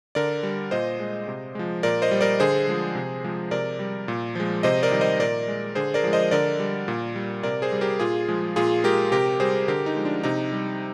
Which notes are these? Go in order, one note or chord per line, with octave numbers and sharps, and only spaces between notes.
D3 A#4 D5
G3
A#2 C5 D#5
G#3
C3
F3 G#3
A#2 A#4 D5
C5 D#5
G3
A#4 D5
D3 G#4 C5
F3 G#3
C3
F3 G#3
C3 A#4 D5
G3
A#2
F3 G#3
C3 C5 D#5
A#4 D5
D#3 G3
C5 D#5
A#2 A#4 D5
G#3
D3 G#4 C5
A#4 D5
F3 G#3
C5 D#5
D3 A#4 D5
G3
A#2
G3
C3 A#4 D5
G#4 C5
G3
G4 A#4
A#2 F4 G#4
F3 G#3
A#2 F4 G#4
G#3 G4 A#4
C3 G4 A#4
G3 G#4 C5
D3 G4 A#4
D#4
F3 G#3
D4
C3 D#4
G3